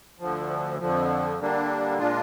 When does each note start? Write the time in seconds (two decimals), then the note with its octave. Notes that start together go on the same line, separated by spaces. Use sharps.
0.20 D2 D3 F3
0.79 F2 D3 F3
1.39 D3 G3 A#3 D4
1.98 A#2 G#3 D4 F4